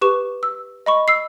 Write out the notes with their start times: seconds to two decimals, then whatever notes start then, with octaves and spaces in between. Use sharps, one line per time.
0.02 G4 B4 C#6 E7
0.43 E6
0.86 D#5 B5 C#6
1.08 E6 C7